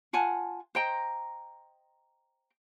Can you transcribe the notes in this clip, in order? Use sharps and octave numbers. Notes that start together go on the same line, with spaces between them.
F4 F#5 G#5 A5
C5 D#5 G5 A#5